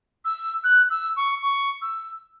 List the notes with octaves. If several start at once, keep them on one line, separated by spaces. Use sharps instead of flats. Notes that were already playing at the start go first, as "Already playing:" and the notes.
E6
F#6
E6
C#6
C#6
E6